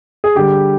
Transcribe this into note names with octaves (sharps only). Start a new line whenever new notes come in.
G#4
D3 G3 G4